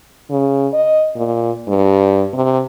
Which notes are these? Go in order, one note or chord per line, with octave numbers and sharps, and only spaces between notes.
C#3
D#5
A#2
G2
C3